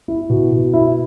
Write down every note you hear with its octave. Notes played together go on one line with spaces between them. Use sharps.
E4
B2
B2
E4